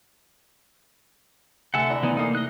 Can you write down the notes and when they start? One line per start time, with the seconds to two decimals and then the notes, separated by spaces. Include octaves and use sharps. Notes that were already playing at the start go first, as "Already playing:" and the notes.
1.74 D2 C3 A4 E5 F#5 G#5
1.90 E4 D5 A#5
2.03 E3 B3 D#4
2.17 A#3 D#4 A4 F5 D#6
2.35 D#5 F#6